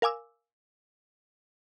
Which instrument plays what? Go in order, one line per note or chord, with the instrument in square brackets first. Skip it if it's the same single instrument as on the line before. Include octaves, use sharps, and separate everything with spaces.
[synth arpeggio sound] A#4 F5 G#5 D6 E6